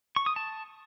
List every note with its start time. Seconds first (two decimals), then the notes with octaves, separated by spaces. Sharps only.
0.16 C#6
0.26 D#6
0.36 A5